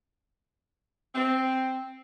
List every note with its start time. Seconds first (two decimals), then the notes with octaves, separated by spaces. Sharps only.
1.15 C4